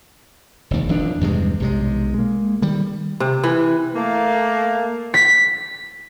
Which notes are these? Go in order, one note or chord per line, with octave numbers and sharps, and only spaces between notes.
F1 D#2
D#1 F2 E3 D4
E2 G2 C3 G#3
B1 C3 G#3
G#3 A#3
D#3 G3
C3
E3
A3 A#3
B6